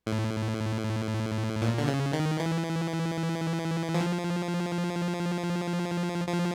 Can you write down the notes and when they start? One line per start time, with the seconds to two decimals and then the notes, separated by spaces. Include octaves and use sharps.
0.06 A2
1.62 A#2
1.78 D3
1.88 C#3
2.13 D#3
2.40 E3
3.94 F3
6.27 F3